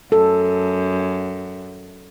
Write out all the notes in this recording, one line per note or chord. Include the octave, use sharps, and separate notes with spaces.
F#2 A4